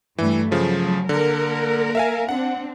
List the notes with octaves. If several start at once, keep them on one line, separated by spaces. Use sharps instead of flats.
G2 E3 G3 A3
C#3 F3 F#3 A3
D3 A#3 A#4
E5 F5 G#5
C4 D4 F#5